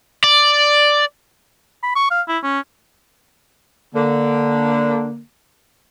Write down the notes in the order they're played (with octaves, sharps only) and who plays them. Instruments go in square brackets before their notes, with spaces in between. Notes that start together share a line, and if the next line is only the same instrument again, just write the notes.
[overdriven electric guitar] D5
[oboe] B5
C#6
F5
E4
C#4
[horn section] D3 A#3